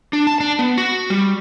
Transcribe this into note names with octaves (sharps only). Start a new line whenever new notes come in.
D4
A5
D4
B3
F#4
G3